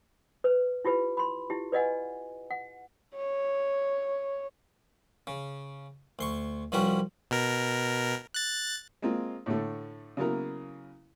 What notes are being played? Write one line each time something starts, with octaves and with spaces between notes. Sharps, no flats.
B4
E4 F4 G4 B4
B5 C6
E4 F4 G4
B4 D5 D#5 F#5 G#5
F#5
C#5
C#3
D2 C6 C#6
C2 F3 G3 C#4 F#4 B4
B2 A#4
F#6 A6
G#3 A#3 C4 F4
A2 D3 A3
C#3 F#3 A#3 B3 E4 A#4